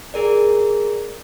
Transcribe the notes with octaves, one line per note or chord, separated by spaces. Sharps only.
G#4 A#4 D5